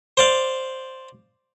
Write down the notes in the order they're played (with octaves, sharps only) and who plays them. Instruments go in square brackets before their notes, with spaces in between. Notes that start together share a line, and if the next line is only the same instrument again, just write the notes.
[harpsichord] C5 D5 F5